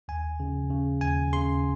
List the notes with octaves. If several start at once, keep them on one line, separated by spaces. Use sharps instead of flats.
D#2 G#5
C#3
C#3
D#2 G#5
C#3 C6